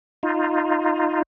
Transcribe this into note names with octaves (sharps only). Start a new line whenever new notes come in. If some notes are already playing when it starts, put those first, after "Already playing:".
D#4 F4